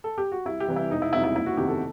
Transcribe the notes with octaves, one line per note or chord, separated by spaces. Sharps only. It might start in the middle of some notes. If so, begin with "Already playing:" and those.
A4
G4
F#4
C2 E4
G4
C3 E3 G3
E4
E1 D#4
E4
E2 C3 F#3 E4
E4
F#1 E4
F#4
E2 C3 D#3 G4
A4